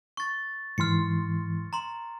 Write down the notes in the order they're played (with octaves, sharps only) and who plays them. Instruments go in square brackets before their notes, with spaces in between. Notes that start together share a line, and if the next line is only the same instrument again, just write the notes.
[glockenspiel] C#6 A6
[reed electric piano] G#2 E3 C6 [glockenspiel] F6 C#7
[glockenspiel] A#5 C6